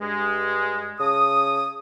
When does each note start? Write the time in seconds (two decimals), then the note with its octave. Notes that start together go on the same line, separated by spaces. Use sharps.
0.01 G2 G#3
1.00 C#3 A5 D#6